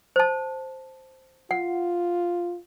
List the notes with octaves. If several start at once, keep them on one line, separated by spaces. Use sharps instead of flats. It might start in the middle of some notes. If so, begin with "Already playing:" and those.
C5 A5
F4 F#5